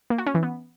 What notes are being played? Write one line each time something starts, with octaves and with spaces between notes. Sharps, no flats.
A#3
F#4
C#4
E3
B3